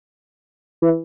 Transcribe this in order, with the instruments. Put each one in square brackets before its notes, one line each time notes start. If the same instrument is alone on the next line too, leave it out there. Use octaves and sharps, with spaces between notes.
[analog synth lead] E3